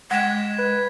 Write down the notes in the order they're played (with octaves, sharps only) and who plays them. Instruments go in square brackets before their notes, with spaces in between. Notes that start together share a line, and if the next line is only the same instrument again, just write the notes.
[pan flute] G#3 [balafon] F#5 G5 [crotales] G#6 B6 E7
[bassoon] B4